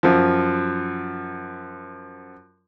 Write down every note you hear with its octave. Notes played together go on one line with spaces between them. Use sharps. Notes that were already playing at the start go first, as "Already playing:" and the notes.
F#2 F3